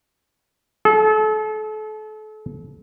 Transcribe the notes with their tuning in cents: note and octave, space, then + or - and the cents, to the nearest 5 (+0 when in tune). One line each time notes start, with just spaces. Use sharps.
A4 -35